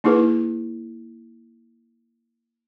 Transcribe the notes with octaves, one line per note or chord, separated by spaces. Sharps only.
A#3 D#4 E4 G#4 B4